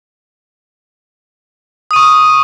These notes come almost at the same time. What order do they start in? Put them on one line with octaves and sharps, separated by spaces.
D#6 D#7 C#6